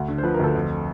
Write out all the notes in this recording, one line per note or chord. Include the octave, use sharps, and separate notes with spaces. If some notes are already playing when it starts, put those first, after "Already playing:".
Already playing: D2 F#5
D3
C5
F3 B4
A#4
D2 A4
F2